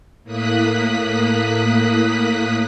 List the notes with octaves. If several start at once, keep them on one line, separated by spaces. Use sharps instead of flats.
A2 A#3 D#6 F#6 B6